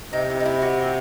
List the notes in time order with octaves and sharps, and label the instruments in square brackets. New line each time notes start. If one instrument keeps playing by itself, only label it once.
[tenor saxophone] C3 [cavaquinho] D#4
[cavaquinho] E4
D#4
E4
F#4